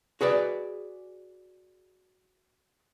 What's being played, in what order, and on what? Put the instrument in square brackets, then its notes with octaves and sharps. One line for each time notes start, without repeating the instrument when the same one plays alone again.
[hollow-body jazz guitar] F#4 G#4 B4 D5